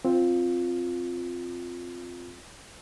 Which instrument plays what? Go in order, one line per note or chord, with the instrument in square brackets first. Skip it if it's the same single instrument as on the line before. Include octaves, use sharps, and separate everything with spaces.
[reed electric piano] C4 F4